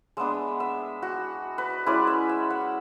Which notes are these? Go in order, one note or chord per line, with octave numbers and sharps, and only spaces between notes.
G#3 B3 D4 E5
E5
F#4
B4
G#3 C#4 E4 D5
E5
E5
F#5